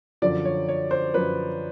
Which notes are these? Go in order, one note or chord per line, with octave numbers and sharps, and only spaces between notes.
F#2 D3 F3 D5
C#5
C#5
C5
F#2 D3 F3 B4